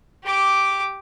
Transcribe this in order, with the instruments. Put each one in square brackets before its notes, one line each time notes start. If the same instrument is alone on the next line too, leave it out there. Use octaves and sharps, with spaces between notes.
[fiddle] G4 D6